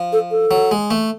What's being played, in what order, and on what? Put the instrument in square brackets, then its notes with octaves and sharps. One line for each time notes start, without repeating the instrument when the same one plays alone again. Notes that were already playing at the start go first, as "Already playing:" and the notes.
Already playing: [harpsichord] F3
[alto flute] A4
A4
[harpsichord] F#3
G#3
A3